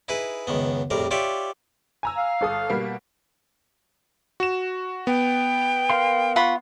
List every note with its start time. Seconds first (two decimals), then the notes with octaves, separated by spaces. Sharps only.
0.08 D#4 E4 G#4 B4
0.47 C#2 F#2 D#3 B3
0.90 A#1 F2 A2 G3 A#4
1.11 F4 G4 C#5 D5 E5 G5
2.03 G#5 A#5 E6
2.17 F5
2.41 G1 A4 D#6
2.70 B2 G3 A#3
4.40 F#4 E7
5.07 B3 G5
5.90 A#4 F5 C6
6.36 F4 F#5 B5 C#6